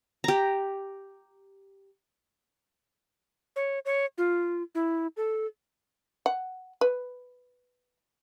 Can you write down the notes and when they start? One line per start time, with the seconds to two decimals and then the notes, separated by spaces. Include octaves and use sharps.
0.24 G4 A#5
3.56 C#5
3.85 C#5
4.18 F4
4.75 E4
5.17 A4
6.26 F#5
6.81 B4